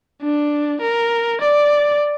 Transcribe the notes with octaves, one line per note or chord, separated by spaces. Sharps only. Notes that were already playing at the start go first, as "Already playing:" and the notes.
D4
A#4
D5